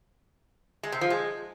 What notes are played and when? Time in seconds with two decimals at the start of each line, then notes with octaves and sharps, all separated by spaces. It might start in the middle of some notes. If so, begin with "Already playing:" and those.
0.83 G#3
0.92 C3
1.01 F3
1.10 G#3